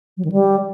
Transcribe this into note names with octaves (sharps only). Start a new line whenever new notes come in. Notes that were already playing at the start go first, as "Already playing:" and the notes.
F#3
D#3
G3